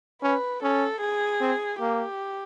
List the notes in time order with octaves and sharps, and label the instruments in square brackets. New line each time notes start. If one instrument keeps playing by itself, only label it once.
[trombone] C#4 [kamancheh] B4
[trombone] C#4 [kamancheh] A4
[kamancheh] G#4
[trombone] C4
[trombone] A#3 [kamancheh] G4